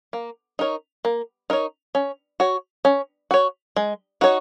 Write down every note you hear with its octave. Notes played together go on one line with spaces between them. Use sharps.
A#3
D#4 A#4 C#5
A#3
D#4 A#4 C#5
C#4
F#4 C#5
C#4
F#4 C#5
G#3
D#4 F#4 C#5